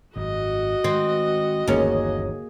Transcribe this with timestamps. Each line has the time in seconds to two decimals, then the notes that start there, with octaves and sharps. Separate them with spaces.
0.16 G#1 F#2 F#4 D#5
0.84 D#3 G#3 C4
1.67 G1 D#2 E3 A#3 C#4 G#4